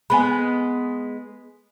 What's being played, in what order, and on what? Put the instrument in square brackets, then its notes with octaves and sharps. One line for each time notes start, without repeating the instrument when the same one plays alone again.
[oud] G#3 B3 [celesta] G#5 B5